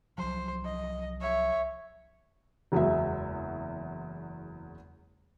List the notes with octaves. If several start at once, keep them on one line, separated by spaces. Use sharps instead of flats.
C2 F3 F#3 C5
D#5
C#5 E5
F#1 E2 F#3 G#3 E5